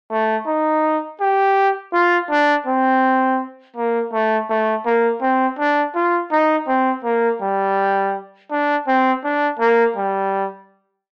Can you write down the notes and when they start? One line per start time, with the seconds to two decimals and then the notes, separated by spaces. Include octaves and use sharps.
0.11 A3
0.47 D#4
1.21 G4
1.93 F4
2.30 D4
2.66 C4
3.76 A#3
4.13 A3
4.50 A3
4.86 A#3
5.21 C4
5.59 D4
5.95 F4
6.31 D#4
6.68 C4
7.04 A#3
7.41 G3
8.51 D4
8.87 C4
9.24 D4
9.59 A#3
9.96 G3